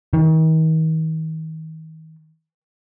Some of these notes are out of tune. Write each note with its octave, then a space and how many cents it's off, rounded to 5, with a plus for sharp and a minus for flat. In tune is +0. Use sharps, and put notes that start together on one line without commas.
D#3 +40